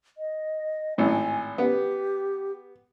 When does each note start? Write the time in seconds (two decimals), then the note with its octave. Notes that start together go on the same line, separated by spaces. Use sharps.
0.18 D#5
0.98 G#1 A2 G#5
1.58 B3 G4